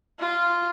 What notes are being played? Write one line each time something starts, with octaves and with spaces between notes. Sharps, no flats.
F4